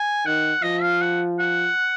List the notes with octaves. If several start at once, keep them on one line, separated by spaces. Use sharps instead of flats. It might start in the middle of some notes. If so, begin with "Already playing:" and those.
Already playing: G#5
D#3 F#5
F3 D#5
F5
F#5
F#5